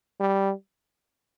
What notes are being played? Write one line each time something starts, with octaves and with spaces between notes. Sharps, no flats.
G3